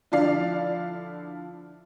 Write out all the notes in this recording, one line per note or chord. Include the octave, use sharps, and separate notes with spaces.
D3 F3 E4 D5 F5 C7